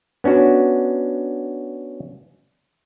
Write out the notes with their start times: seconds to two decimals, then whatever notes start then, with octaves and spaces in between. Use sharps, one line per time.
0.24 B3 C#4 D4 F#4